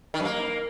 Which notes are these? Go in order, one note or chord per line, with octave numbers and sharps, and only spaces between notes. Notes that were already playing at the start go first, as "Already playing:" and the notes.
D#3
F#2
A#3